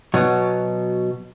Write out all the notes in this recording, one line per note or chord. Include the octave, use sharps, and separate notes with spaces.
B2 F#3